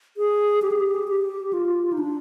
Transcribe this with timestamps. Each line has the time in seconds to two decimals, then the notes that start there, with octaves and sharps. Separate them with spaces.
0.17 G#4
0.62 G4
0.72 G#4
0.80 G4
1.08 G4
1.53 F4
1.93 D#4
1.99 D4